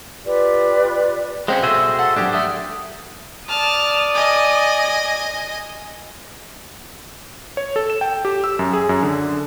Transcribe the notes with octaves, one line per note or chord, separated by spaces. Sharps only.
F4 G4 B4 D5
G#3 C4 C#4 C5 F5 G5
B2 F#4 G#4 A4 C5 E5
A4 F#5
G#2 F#3 D4 G4 G#4
A4 E5 D#6
D5 A5 D#6 F6
D#5 G#5
C#5
A4
E7
G5
G4
E6
F#2
G#4
F#2
D3